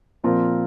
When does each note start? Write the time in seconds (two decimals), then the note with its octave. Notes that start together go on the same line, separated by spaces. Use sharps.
0.24 A#2 F3 C4 F4 A#4